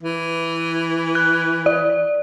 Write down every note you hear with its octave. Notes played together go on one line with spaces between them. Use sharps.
E3
F#6
D5